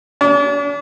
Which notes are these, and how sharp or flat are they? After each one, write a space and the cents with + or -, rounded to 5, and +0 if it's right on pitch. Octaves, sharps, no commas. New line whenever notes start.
D4 -45